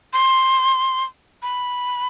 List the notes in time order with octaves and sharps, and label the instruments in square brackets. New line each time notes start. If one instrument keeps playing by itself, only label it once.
[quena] C6
B5